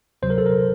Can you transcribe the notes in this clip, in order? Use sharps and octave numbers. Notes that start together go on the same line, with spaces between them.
D2 C3 F#3 C5
A#4
A4
A#4